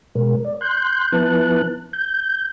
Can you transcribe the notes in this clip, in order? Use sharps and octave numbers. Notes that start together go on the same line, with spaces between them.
B2 G#3 A#4
D5
C6 F#6 G6
F3 B3 E4 B4 A5 F#6
G6